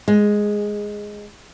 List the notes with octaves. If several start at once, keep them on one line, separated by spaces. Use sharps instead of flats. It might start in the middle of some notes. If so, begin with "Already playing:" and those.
G#3